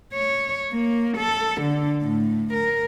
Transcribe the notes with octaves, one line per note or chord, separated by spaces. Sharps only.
C#5
A#3
A4
D3
A2
A#4